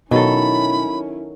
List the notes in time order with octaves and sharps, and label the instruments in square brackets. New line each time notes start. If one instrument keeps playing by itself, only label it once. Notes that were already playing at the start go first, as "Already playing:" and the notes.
[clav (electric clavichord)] B2 [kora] D#3 F#3 A4 [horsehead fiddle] C#4 E4 [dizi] B5